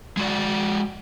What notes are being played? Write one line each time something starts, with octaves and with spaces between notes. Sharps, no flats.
G#3 F#4 D5